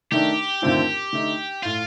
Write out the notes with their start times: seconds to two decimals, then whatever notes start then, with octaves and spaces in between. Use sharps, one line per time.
0.12 D#3 A3 D4 G4
0.62 D#2 D3 A3 C4 F4
1.13 D3 A3 D#4
1.63 A2 A3 F4